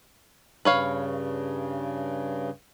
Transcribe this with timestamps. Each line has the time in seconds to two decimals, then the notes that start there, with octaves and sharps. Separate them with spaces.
0.65 G2 C#3 B4 C#5 F5